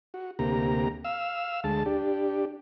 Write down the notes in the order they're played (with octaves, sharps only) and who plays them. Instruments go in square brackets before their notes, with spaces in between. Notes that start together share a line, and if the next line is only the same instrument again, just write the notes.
[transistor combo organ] F#4
D2 C3 A#3 G4 A#5
F5 E6
D2 G#3 A5
D4 G4